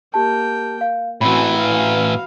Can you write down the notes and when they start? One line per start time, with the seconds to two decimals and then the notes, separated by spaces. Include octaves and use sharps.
0.14 A#3 G4 G5 A5
0.81 F5
1.21 A2 E3 C4 F#4 B5
1.56 F#4 F5